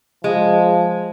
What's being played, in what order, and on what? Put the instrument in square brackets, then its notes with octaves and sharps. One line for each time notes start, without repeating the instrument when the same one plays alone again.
[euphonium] F3 [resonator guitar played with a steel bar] G#3